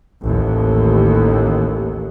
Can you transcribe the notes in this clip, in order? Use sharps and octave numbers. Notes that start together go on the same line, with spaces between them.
A1 D#2